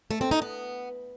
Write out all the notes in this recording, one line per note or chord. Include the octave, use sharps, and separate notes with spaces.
A3
C4
D#4
B3